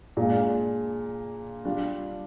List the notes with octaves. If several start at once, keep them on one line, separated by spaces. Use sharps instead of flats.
A#2 G#3 D4 F4
G3 D4 F4